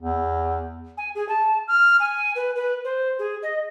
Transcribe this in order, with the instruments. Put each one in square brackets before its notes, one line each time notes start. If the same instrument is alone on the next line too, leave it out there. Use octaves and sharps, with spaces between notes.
[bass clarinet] E2
[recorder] G#5
G#4
A5
F6
G#5
B4
B4
C5
G#4
D#5